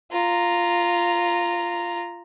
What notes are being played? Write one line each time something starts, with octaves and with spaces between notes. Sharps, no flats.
F4 A#5